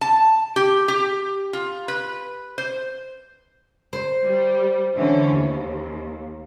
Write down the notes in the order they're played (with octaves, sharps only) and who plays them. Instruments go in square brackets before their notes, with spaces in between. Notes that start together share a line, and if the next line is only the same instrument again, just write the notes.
[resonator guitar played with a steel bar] A5
G4
G4
F4
B4
C5
[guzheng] C5
[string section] G3
D3 E3 C#4
D#2